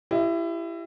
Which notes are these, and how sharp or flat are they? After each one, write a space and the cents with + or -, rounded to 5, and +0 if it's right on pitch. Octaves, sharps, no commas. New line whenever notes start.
E4 +25 G4 +0 D#5 +0